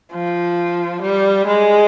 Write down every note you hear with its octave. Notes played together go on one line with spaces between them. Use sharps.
F3
G3
G#3